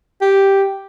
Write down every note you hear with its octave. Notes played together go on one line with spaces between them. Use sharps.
G4